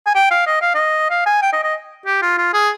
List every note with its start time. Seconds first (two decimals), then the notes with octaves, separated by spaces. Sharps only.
0.06 G#5
0.15 G5
0.31 F5
0.47 D#5
0.61 F5
0.74 D#5
1.10 F5
1.26 G#5
1.42 G5
1.53 D#5
1.63 D#5
2.06 G4
2.22 F4
2.38 F4
2.53 G#4